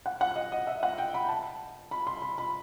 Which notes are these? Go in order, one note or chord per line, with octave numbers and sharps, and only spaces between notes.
F#5
F#5
D#5
D#5
E5
F#5
G5
B5
A5
B5
C6
B5
B5